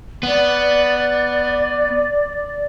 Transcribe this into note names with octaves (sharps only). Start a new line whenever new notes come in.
B3 D5